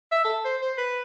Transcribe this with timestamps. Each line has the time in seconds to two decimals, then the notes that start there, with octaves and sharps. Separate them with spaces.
0.12 E5
0.25 A4
0.45 C5
0.62 C5
0.78 B4